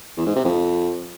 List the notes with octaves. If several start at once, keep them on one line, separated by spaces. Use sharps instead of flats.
E2
G#2
C3
F2